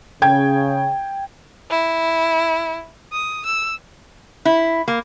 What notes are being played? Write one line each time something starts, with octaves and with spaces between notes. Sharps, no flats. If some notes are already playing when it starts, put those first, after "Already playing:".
C#3 G5 G#6
E4
D#6
E6
E4
A#3